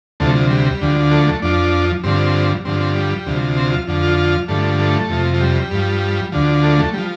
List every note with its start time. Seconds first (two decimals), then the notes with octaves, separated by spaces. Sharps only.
0.20 D2 C3 F3 A3
0.35 F3
0.50 G3
0.81 D2 D3 F3
1.11 A3
1.27 A3
1.42 F2 F3 D4
2.04 G2 D3 F3 C4
2.65 G2 D3 F3 C4
2.80 C4
2.95 G3
3.26 D2 C3 F3
3.57 C4
3.72 F4
3.87 F2 D3 F3
4.03 F4
4.18 F4
4.48 G2 D3 F3 A3
4.79 A3
5.10 F2 C3 F3
5.34 F3
5.41 G3
5.71 G2 F3
6.32 D2 D3 F3
6.63 A3
6.79 A3
6.94 F3 G3